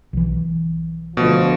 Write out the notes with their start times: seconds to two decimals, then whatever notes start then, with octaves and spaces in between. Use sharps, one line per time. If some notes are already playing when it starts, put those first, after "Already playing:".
0.13 B1 E3
1.17 D2 B2 F3